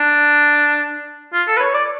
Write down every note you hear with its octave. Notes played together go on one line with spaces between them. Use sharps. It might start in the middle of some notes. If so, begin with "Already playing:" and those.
Already playing: D4
F4
A4
B4
C#5
D5